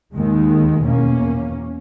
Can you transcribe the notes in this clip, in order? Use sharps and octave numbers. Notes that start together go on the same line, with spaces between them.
D#2 D#3 G#3
E2 B2 A#3 C#4